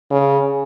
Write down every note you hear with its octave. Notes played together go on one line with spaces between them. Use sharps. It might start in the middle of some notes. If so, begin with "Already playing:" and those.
C#3